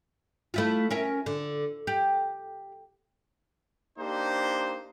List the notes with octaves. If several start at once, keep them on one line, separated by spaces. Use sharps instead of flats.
A3 E4 F4
C#4 A#4 E5
D3
G4
A#3 D4 D#4 G4 C5